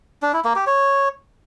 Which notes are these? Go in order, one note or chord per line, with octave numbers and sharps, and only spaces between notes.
D4
E4
A#3
G4
C#5